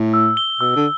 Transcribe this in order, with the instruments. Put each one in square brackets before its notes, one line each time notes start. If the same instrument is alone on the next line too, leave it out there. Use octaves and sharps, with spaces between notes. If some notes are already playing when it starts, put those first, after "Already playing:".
Already playing: [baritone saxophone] A2
[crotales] E6
G7
[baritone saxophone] B2 [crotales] E6
[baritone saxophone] D3